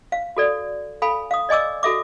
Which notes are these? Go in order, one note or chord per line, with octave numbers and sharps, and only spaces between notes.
F5
F#4 A4 D5
A4 F5 G#5 B5
F5 D#6
D5 D#5 G#5 D6 E6
F#4 A4 E5 D6